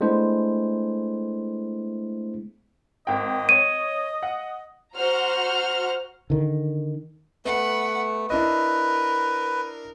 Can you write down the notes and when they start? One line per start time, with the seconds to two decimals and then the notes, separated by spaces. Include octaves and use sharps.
0.01 G#3 A3 B3 D4 E4 C5
3.07 G#1 D#5 G5
3.49 C#5 D#7
4.23 F#5
4.96 F#4 C5 F#5 A#5 F6
6.30 D3 D#3
7.45 A3 B3 B4 F#5
8.30 D4 E4 A#4 B4 D#5